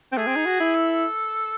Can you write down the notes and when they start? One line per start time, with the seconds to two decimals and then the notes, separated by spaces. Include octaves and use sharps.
0.12 C4
0.17 A3 G#4
0.27 C4
0.36 D#4
0.46 F#4
0.60 E4
0.74 A4